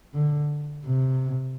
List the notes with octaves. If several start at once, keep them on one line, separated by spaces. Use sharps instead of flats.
D3
C3